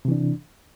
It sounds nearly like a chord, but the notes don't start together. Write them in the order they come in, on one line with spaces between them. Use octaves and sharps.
C3 E3 D4